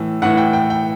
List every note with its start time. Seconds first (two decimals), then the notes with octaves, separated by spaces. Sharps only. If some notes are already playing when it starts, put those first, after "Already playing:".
Already playing: A2 E3
0.22 A2 E3 F#5
0.37 G5
0.53 G5
0.70 G5